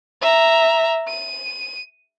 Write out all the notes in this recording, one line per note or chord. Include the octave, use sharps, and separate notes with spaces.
E5 A#5
D#7